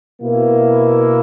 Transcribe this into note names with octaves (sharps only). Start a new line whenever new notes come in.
B2 A#3 E4